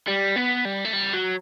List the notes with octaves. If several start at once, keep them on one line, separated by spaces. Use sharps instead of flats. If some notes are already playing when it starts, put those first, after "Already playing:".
G3
B3
G3
A3
G3
F#3